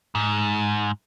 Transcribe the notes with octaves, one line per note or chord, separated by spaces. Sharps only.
G#2